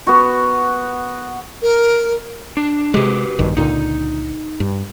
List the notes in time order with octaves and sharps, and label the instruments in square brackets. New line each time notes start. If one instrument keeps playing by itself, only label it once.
[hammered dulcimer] B3 F#4
[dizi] A#4
[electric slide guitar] D4
[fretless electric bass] C3 G#3 [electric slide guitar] F#4 G4 B4
[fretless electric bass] A#1 G2 D#3
[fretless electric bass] C#2 A#2 D3 [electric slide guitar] D#4
[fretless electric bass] G2